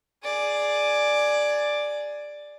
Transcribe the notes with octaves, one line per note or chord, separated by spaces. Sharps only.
G#4 D5